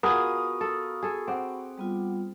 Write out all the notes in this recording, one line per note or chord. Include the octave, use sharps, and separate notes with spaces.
B3 F4 F#4 G#4 A#4 B5 C#6 D#6
A4
G#4 A4
C4 F#5 D6
G3 B3 F4